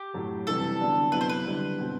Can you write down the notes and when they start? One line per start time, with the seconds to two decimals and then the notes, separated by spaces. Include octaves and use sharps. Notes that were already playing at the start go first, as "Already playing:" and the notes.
Already playing: G4
0.14 A2 F#3 A3
0.47 C3 E3 G3 A4
0.79 D3 F#3 B3 D4
1.12 C3 F#3 B3 E4 B4
1.21 C5
1.29 B4
1.45 D3 G3 C4 E4
1.78 B2 F#3 C4